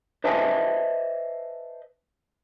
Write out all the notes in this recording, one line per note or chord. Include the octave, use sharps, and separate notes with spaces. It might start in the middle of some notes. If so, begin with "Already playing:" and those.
B4 C5 D#5 E5 G#5 A5